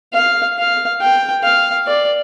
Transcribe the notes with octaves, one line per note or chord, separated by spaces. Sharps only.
F5
F5
G5
F5
D5